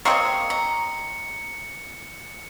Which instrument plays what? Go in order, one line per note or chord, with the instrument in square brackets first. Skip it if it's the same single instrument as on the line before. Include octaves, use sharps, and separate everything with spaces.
[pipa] A#3 C4 [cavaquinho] C#5 D#5 C#6 [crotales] C#7
[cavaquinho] A#5